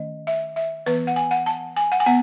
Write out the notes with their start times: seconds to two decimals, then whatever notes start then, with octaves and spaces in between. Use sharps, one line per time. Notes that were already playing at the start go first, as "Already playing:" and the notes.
Already playing: D#3 A3 C#4 D#5
0.27 E5
0.56 E5
0.86 E3 B3 B4
1.07 F#5
1.16 G#5
1.31 F#5
1.46 A5
1.76 G#5
1.92 F#5
2.00 G#5
2.06 B3 F#5